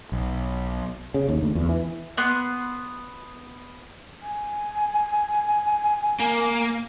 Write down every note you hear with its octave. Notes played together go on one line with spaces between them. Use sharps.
B1
C#3
D#2
D2
E2
E3
B3 C6 F#6
G#5
A#3